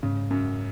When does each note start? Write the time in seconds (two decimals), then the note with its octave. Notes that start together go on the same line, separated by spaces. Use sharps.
0.03 G#2 C#3
0.31 F#2